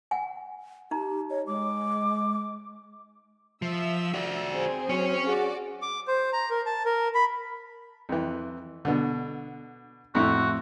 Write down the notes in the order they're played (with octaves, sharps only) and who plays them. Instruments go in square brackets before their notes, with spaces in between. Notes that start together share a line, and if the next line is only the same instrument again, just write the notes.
[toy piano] F#5 G#5
[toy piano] D#4 A#5 [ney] G4
[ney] C#5 [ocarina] D#5
[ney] G#3 [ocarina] D6
[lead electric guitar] F3 [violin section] E5 E6
[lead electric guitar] F#4 D5
[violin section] C4 G#4 C5
[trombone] F#3 [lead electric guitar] C#4 C#5
[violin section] F#4 D5 D6 [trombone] G#4
[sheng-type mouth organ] D6
C5
A#5
A#4
A5
A#4
B5
[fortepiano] F2 E3
B2 D3
[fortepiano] F2 A2 [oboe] F#4